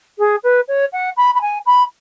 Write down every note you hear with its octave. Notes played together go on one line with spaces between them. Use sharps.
G#4
B4
C#5
F#5
B5
B5
G#5
B5